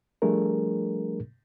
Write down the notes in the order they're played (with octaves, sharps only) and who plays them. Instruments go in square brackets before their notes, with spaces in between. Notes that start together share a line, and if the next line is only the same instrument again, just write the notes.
[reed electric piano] F3 G3 A3 D4 G#4 A#4